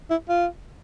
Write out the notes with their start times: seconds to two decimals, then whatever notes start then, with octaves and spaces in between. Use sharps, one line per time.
0.10 E4
0.29 F4